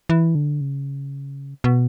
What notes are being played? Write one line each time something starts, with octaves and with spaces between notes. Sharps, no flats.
E3
D3
C#3
B2